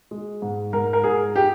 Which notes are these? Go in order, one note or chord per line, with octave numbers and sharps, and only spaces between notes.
G#3
G#2
G#2 A#4
A#4
G#2 G#4
G4